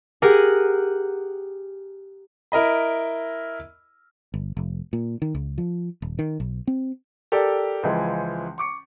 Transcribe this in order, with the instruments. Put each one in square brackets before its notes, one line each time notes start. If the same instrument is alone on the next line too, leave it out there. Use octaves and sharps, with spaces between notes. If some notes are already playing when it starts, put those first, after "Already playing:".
[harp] G4 G#4 A#4 F#5
[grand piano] E4 A#4 D#5 B5
[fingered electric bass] G1
F1
A#2
D#3
C#2
F3
D#1
D#3
B1
C4
[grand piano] G4 A4 A#4 D5
C#2 E3 F3 G#3
C#6 D6 C#7